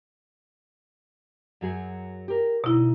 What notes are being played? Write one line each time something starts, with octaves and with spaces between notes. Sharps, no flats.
F#2 F#3 G#4
G4 A#4
D2 B2 D#4 E4